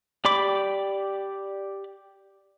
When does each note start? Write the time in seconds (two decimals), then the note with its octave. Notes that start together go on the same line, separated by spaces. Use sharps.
0.25 G4 D5 B5 D6